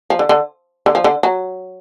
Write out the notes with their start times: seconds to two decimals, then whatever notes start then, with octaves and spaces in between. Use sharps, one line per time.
0.10 F3
0.19 D3
0.29 D3
0.86 D3
0.95 F3
1.04 D3
1.23 F#3